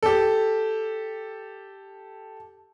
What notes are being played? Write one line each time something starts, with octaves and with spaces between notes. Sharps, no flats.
G4 A4